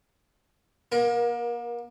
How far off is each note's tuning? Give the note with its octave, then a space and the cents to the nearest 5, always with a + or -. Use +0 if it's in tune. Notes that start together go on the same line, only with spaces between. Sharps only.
A#3 +40 A#4 +25